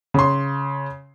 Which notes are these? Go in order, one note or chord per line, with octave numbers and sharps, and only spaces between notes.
C#3 C6